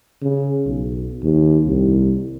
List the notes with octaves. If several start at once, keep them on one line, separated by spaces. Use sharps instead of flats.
C#3
B1
D#2
C2